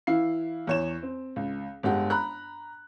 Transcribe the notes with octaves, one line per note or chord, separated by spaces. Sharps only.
E3 E4 F5 C7
E2 C#5 E7
C4
C#2
G1 G#3 G4 F#5
A#5 B5 F#6